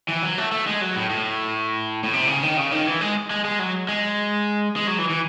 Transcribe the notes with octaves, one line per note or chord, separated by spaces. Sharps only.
E3
F#3
A3
A3
G#3
F#3
A2
A2
A2
C3
C#3
D#3
C#3
D#3
E3
G#3
G#3
G#3
F#3
G#3
G#3
F#3
E3
E3